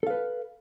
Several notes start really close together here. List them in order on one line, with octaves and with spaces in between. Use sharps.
A4 F5 B4